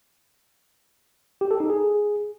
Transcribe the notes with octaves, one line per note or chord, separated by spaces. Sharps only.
G4
A4
D#4
G#4